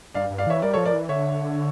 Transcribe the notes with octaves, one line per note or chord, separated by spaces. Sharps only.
G2 D5 F5
G2
D5 F5
E3 C#5 E5
G3 A#4 D5
A4 C#5
F3
A#4 D5
E3
D3 C#5 E5